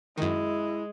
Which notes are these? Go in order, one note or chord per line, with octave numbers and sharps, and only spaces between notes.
F#2 D#3 G#3 E4